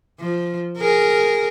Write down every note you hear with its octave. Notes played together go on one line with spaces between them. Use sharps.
F3
G#4 A#4